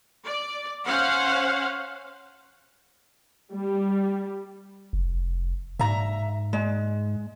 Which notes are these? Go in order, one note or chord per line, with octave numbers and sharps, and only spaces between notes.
D5
C#4 C5 F5 F#5
G3
F1
G#2 E5 A#5
G#3